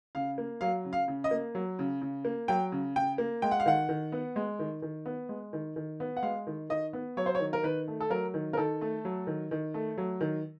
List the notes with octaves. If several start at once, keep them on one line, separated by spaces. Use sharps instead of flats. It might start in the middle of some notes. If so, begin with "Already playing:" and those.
C#3 F5
A#3
F#3 F5
C#3
F5
C#3
D#5
A#3
F#3
C#3
C#3
A#3
F#3 G5
C#3
C#3 G5
A#3
G#3 G5
F#5
F5
D#3 F#5
D#3
B3
G#3
D#3
D#3
B3
G#3
D#3
D#3
B3
F#5
G#3 F5
D#3
D#3 D#5
B3
F#3 C#5
C5
C#5
D#3
A#4
D#3 B4
A3
A4
F#3 A#4
D#3
A#4
D#3 A4
A3
F#3
D#3
D#3
A3
F#3
D#3